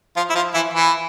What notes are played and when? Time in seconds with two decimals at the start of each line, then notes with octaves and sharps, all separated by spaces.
0.16 F3 F4
0.30 E4
0.35 F3 F4
0.54 E3 E4
0.73 E3 E4